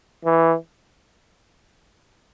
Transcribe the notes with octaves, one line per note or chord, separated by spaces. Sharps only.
E3